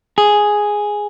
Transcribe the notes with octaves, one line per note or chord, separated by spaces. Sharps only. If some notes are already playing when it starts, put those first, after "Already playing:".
G#4